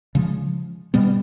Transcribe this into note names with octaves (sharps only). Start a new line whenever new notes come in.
C#3 F3 G#3
B2 G3 B3